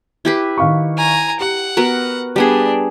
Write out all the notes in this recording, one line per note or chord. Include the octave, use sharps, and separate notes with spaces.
E4 G4 B4
D#3 F5 C#6
G#5 A#5
G4 F#5
B3 F#4 A#4
G3 B3 D4 G#4